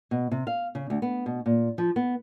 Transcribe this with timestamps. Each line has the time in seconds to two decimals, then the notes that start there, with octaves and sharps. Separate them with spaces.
0.11 B2
0.31 C3
0.47 F5
0.75 C#3
0.90 D2
1.02 B3
1.26 B2
1.46 A#2
1.78 F3
1.96 B3